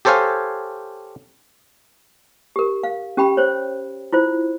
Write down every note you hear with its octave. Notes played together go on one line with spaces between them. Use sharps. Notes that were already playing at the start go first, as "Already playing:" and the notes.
G4 A4 C5 C#5 F5 G#5
G4 A#4
F5
C#4 G4 G5 B5
C5 C#5
E4 F4 C5